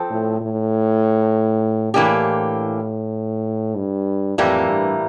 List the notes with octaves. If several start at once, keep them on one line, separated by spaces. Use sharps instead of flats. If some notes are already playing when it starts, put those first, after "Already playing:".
Already playing: F3 C4 A4
A2
A2
A2 E3 A#3 D4 G4
G2
F2 A2 E3 G3 A#3
G2